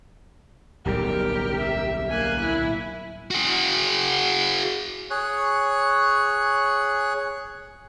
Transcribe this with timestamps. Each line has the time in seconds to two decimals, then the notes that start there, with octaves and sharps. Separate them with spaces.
0.85 D1 B1 G3 G4 A#4
1.58 E5
2.09 A#3 G#5 F#6
2.40 E4
3.31 F#4 G#4
5.11 G#4 C#5 C#6 F#6